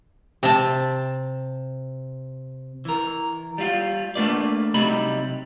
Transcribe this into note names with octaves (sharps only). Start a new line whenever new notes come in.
C3 A5
E3 A#4
G3 F4
A3 A#3 D4 B4 D5
C2 C3 F#3 G3 D#4 B5